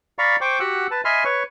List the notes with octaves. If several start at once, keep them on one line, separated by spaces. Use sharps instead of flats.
D5 F5 A#5 B5 C#6
C5 G5 C#6 D6
F#4 G4 F#5 E6 F#6
B4 A5
D#5 E5 G#5 B5 C6 F6
B4 C#5 C#6